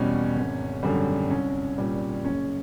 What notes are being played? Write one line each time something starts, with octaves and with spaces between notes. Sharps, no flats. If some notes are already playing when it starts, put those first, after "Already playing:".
Already playing: E2 B2 G3 C#4
G#1
F#2 D3 G3
C2 C#4
A#2 G3
F#1 C#4